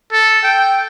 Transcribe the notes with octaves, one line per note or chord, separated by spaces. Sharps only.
A4
G5